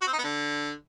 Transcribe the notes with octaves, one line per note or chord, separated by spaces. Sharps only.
F#4
C4
D#4
B3
D3